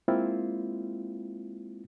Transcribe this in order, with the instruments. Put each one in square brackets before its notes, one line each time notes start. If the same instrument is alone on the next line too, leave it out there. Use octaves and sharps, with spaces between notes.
[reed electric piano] G#3 A#3 C4 E4 F4